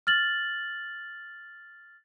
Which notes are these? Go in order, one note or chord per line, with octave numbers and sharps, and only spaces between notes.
F6 A6 F#7